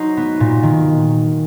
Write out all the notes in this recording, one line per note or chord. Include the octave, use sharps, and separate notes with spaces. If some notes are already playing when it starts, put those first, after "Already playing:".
Already playing: F#3 D#4 C5
B3
A#2
D#3